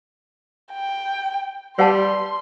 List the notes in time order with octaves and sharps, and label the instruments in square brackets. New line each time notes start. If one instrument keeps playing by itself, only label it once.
[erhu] G5
[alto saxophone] G3 [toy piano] B4 F#5 A5 [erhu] C6